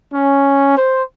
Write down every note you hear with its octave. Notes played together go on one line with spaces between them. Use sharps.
C#4
C5